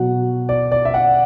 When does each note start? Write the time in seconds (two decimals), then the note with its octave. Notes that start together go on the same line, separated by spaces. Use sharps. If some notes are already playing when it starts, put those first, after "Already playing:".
Already playing: B2 F#3 F#5
0.49 D5
0.71 D5
0.85 E5
0.94 F#5